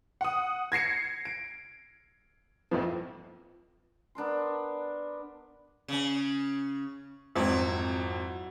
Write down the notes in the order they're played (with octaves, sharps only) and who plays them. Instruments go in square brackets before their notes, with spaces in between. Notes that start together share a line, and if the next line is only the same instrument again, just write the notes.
[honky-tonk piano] F#5 D#6
G#6 A#6 C7 C#7
D7
A#1 F2 F3
[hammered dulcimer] B3 D4 A#4 C6
[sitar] C#3 C#4
[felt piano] G#1 F2 [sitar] F#3 E4